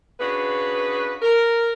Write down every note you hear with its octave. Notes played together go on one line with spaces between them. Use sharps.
C#3 D4 F#4 B4
A#4